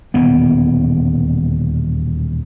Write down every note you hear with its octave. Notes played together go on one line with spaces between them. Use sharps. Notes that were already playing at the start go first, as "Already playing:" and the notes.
D#1 E2 B2 B3